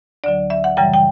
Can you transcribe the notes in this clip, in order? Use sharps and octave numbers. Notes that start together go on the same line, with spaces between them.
D2 D3 F#3 D5
E5
F#5
F#2 C#3 E3 G3 G5
G5